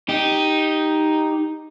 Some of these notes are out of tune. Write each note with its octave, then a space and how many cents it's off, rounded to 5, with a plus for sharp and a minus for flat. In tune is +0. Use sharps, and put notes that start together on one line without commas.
D#4 +0 G4 +0